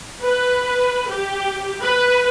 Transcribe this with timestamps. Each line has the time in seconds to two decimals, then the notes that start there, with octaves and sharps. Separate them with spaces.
0.22 B4
1.08 G4
1.82 B4